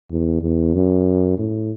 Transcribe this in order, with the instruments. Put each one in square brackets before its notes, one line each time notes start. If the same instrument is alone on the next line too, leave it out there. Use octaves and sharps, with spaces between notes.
[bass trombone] E2
E2
F#2
A2